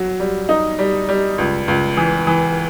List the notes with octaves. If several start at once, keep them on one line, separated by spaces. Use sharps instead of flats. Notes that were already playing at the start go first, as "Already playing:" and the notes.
Already playing: F#3
G3
D#4
G3
G3
C#2
C#2
E3
E3